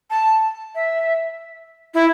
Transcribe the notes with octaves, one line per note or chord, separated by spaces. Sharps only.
A5
E5
E4